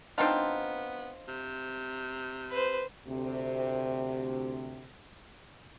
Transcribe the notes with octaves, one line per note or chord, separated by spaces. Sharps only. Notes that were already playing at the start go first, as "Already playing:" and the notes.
B3 C4 D4 D#4 F4 G5 A5
C3
B4 C5
D2 C3